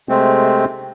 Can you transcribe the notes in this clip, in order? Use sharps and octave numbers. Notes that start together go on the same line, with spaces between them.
C3 G#3 A3 C4